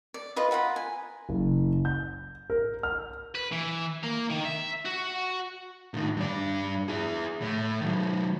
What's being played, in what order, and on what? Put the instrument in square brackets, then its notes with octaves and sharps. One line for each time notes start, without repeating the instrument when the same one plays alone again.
[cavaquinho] D5
F4 B4 D#5
F4 A#4 F#5 B5
G#5
[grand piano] F#1
G6
A#4
F6
[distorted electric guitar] B4
E3
A#3
D#3
E5
F#4
[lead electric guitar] A2 D#3
G2 D5
E4 G#4
A2
D#3 F#3